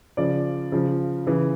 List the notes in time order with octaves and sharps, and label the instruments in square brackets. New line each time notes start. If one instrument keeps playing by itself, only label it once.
[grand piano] C#3 F3 D5
C#3 F3
C#3 E3